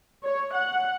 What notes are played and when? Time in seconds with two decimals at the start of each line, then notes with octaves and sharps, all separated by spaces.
0.24 C#5
0.54 F#5